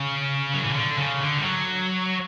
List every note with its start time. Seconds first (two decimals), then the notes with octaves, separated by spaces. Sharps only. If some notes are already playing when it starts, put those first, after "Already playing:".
Already playing: C#3
0.54 F#3
0.64 E3
0.73 D3
0.97 C#3
1.20 D3
1.38 G3
1.43 F#3